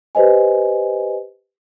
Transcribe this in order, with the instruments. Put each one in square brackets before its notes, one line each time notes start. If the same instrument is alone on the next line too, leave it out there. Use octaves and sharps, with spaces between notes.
[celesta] G4 B4 C5 D#5 G#5